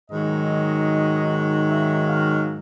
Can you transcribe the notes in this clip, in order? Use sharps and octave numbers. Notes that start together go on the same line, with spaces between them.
G#2 D#3 F#3 D#5
E5
F5